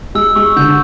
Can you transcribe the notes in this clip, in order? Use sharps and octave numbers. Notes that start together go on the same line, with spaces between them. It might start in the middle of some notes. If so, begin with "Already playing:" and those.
G#3 E6
G#3 C#6
D3 G6